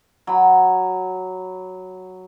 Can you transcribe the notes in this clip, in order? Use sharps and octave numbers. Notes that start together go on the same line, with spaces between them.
F#3 B5